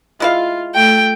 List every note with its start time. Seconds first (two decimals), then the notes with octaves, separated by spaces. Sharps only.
0.20 G#3 E4 F4 F5
0.75 A3 G5